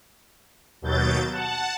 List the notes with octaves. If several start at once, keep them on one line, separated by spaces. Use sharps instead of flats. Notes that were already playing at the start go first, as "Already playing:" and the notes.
D#2 B2 F#3 G6 A6
F#5 A5